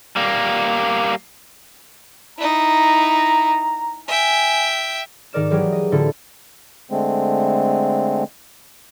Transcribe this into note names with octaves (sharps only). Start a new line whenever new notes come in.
G3 A#3
D#4 E4 A#5
E5 G5 G#5
G#2 D#3 A#4 D5 F6 E7
E3 F#3 G#3 G4 G#4 A#4
D#5
A2 D3 E4 F4 A4
D3 G#3 A3 C4